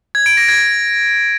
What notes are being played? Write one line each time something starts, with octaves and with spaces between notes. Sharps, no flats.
G#6
D7
A#6
G#6